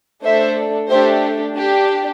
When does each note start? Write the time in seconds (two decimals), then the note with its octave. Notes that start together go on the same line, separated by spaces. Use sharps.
0.24 A3 D4 A4 C5 E5
0.90 A3 D4 G4 C5 E5
1.56 D4 G4